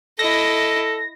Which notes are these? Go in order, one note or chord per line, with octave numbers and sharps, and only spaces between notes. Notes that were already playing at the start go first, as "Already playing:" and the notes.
E4 A4 D#5 A#6